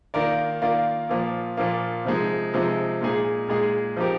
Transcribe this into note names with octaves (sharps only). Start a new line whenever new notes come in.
D#3 A#3 F4 A#4 D5
D#3 A#3 F4 A#4 D5
A#2 F3 A#3
A#2 F3 A#3
C3 F3 G#3 D#4
C3 F3 G#3 D#4
A#2 G#3 D#4 G#4
A#2 G#3 D#4 G#4
F3 C4 D#4 G4 A#4